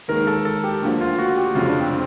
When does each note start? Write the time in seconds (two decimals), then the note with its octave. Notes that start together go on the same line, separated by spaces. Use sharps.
0.08 D#2 D#3 G#3 A#4
0.27 A4
0.45 A4
0.64 G4
0.82 D2 D3 F3 A#3
1.01 F4
1.18 F#4
1.37 G4
1.55 F1 F2 C#3 F4
1.68 D4
1.80 C4